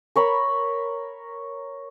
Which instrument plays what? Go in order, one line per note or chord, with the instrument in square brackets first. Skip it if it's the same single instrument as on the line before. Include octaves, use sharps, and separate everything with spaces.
[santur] A#4 C#5 B5